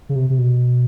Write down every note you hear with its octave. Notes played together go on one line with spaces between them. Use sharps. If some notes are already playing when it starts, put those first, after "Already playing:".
C#3
C3
C3
B2